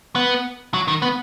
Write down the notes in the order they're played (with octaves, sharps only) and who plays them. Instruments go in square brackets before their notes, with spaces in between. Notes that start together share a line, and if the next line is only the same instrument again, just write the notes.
[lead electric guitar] B3
F#3
D#3
B3